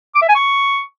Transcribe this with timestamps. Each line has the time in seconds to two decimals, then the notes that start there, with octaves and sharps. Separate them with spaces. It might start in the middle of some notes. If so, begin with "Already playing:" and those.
0.15 D6
0.22 E5
0.29 G#5
0.35 C#6